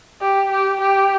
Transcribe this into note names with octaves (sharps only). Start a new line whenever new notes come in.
G4
G4
G4